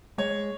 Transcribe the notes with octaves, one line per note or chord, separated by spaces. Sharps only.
G#3 C#5